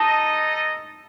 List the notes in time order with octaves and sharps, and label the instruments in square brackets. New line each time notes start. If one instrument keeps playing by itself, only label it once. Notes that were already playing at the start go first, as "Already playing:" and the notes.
Already playing: [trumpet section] D#4 A4 D#5 [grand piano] A5